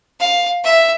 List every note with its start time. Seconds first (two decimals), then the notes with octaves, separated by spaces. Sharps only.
0.20 F5
0.64 E5